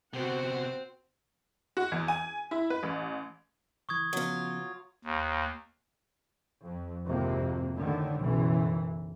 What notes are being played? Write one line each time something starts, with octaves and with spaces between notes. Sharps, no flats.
C3 B3 C4 F#4 F#5
F#4
E2
G#5
E4
B4
A1
C#2 E3 C#6 D#6 G#6
C#3 F3 F#3 B3 F4
D#2
F2
G#1 F2 C3 A#3
A2 D3 D#3
F#1 B1 F#2 E3